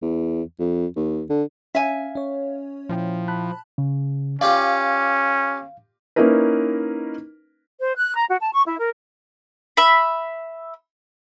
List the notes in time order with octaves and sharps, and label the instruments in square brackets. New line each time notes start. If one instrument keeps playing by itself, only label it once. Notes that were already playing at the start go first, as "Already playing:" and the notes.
[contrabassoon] E2
F2
D#2
D3
[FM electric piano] C#4 [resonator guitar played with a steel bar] E5 G#5 [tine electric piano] F5
[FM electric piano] C#4 C#5
[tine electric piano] A#2 E4 G5 [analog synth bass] F3
[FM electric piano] A5 B5 F#6
[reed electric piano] C#3
[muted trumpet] C#4 [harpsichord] F4 G4 D5 [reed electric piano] F5
[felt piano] A#3 C#4 D#4 E4 A#4 B4
[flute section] C5
F#6
A#5
F#4
A5
C#6
E4
A#4
[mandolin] E5 B5